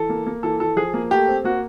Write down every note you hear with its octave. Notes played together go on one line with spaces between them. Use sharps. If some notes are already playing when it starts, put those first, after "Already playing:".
Already playing: E3 A4
A#3
A#3
E3 A4
E3 A4
F3 G#4
A#3
A3 G4
C4
A#3 F#4